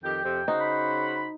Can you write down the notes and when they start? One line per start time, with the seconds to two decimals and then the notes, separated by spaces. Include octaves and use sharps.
0.04 F2 D#3 G4 G5
0.24 F2 C3
0.48 C#3 D#4 F#4 C5
0.61 B5